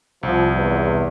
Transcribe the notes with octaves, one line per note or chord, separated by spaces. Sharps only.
C2 F3
E2